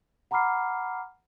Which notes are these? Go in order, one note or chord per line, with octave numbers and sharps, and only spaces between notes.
F#5 A#5 B5 D6 F6 C7